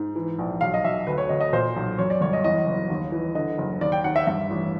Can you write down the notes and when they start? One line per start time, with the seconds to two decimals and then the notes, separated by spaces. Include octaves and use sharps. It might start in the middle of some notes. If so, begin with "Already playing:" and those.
Already playing: G#2
0.16 E3
0.38 A#1
0.61 B1 F5
0.74 D#5
0.84 B1 E5
1.07 D2 B4
1.18 C#5
1.29 D2 D#5
1.41 D#5
1.53 A#2 C5
1.76 B1
1.98 F#2 C#5
2.10 D5
2.21 G1 C#5
2.33 D#5
2.44 E2 D#5
2.67 F#1
2.90 D#2
3.12 E3
3.35 D3 D#5
3.58 F#1
3.81 D#2 D5
3.92 G5
4.04 D#2 F#5
4.16 E5
4.27 G2 E5
4.50 A1